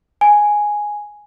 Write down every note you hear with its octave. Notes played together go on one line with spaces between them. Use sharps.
G#5